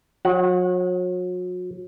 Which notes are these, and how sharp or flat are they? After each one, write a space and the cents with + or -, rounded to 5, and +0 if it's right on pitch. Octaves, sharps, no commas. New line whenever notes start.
F#3 -35 F#5 +0